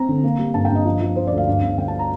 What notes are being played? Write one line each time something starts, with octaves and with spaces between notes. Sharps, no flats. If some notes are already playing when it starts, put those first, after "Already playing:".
Already playing: C4 A#5
D3
A#3
G3
G2 A5
G2 G5
D#5
F3
F3
F3 C5
D2 D5
F5
G2
G1
G1 G5
A5
A#5